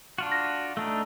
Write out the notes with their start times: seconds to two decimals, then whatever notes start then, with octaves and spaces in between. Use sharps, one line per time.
0.18 D4 F4 F#4
0.32 A#6
0.77 A3 D4 D#4